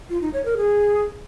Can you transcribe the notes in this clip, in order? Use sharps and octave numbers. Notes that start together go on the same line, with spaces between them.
F4
D#4
C#5
A#4
G#4